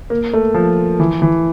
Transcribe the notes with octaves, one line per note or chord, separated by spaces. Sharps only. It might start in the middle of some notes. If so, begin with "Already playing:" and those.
A#3
A3
F3
E3
E3